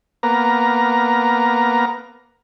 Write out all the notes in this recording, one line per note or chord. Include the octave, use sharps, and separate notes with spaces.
A#3 B3 A#5